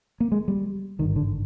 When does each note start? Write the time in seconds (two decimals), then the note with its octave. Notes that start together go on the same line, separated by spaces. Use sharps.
0.20 A#3
0.32 G#3
0.48 G3
0.99 G#1 G2 D3 D#3
1.16 D3